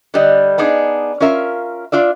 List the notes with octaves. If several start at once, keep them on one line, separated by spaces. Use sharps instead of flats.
D3 G3 D#5
B3 D4 D#4 G#4
C#4 F4 A#4 E5 F5
D4 F4 D5 E5